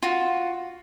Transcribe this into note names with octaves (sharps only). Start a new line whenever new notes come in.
F4 F#4